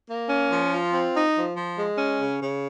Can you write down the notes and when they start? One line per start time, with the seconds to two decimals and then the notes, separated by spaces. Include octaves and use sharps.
0.07 A#3
0.29 C#4
0.50 F3
0.71 F4
0.92 C4
1.14 D#4
1.35 F3
1.55 F3
1.77 G#3
1.97 C#4
2.19 C#3
2.41 C#3